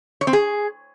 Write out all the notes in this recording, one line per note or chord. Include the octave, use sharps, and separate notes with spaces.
C#5
C4
G#4